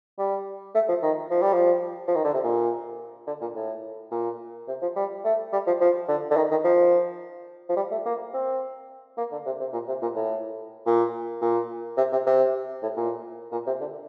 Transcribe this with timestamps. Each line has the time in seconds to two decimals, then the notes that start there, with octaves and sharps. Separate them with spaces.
0.19 G3
0.74 A3
0.89 F3
1.03 D#3
1.30 F3
1.42 G3
1.53 F3
2.08 F3
2.15 D#3
2.24 D3
2.34 C3
2.44 A#2
3.27 D3
3.41 A#2
3.55 A2
4.11 A#2
4.68 C3
4.82 F3
4.96 G3
5.24 A3
5.53 G3
5.67 F3
5.81 F3
6.08 D3
6.30 D3
6.36 D#3
6.51 D#3
6.64 F3
7.69 F3
7.76 G3
7.91 A3
8.05 A#3
8.33 C4
9.18 A#3
9.32 D3
9.46 C3
9.60 C3
9.73 A#2
9.88 C3
10.02 A#2
10.15 A2
10.86 A#2
11.42 A#2
11.97 C3
12.12 C3
12.26 C3
12.82 A2
12.97 A#2
13.52 A#2
13.67 C3
13.80 D3